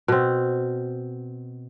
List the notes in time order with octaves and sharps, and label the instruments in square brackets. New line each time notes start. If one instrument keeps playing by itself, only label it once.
[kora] B2 C4